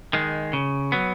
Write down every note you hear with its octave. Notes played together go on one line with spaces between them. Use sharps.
D#3 G#3
C#3
F#3 B3